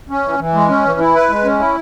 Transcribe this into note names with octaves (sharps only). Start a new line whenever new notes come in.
C#4
E3
E3
G#3
C#4
E3
E4
B4
G#3
C#4
E4